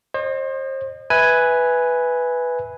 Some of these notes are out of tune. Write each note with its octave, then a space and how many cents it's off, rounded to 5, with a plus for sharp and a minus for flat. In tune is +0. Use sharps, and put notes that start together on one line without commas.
C5 +35 D#5 -30
B4 +0 E5 -25 G#5 +0